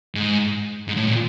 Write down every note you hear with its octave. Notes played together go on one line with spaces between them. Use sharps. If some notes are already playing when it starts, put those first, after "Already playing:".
G#2
G#2
A2
A#2